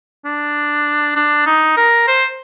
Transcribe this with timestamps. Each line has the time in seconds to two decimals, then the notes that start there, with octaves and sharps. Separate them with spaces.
0.25 D4
1.16 D4
1.46 D#4
1.77 A#4
2.07 C5